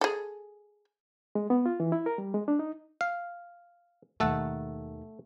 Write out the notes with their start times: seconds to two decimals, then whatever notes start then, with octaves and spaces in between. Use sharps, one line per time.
0.01 G#4 A4
1.35 G#3
1.50 B3
1.66 F4
1.80 E3
1.92 E4
2.06 A#4
2.18 G3
2.34 G#3
2.48 D4
2.59 D#4
3.01 F5
4.20 D#2 B2 A3 A4 F#5